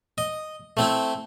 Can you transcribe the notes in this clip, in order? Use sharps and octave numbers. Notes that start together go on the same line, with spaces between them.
D#5
A3 C4 E4